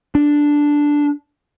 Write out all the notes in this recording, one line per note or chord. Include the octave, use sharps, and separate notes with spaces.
D4